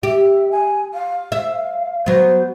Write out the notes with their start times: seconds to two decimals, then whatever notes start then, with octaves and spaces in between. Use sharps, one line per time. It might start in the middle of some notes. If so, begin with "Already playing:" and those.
0.03 G4 E5
0.51 G#5
0.93 F5
1.32 E5
2.06 F#3 B3 C5